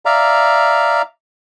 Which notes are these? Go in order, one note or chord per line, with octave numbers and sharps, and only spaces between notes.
D5 E5 F5 A#5